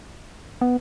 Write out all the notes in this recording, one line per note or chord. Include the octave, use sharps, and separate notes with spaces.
B3